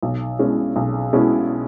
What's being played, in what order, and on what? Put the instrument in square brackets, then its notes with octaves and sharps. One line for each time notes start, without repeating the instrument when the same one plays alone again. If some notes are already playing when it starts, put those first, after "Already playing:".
[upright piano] B1
B2 G#3 C#4 E4
B1
B2 G#3 C#4 E4